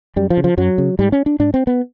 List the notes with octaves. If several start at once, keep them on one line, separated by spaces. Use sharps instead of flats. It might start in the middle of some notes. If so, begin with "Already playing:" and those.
F#2 G3
F3
C#3
F3
F#2 F#3
C#3
G#2 G3
C#4
D4
G#2 D4
C4
B3